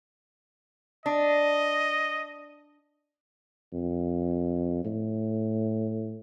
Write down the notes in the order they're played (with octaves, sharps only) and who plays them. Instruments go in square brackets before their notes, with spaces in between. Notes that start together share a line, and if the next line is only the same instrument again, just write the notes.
[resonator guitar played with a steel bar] D4 [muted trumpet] D#5
[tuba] F2
A2